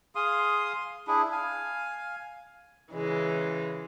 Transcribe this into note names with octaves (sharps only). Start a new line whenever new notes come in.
G#4 F5 C6 D#6
D4 E4 G#4
F5 G#5
C#3 E3 G#3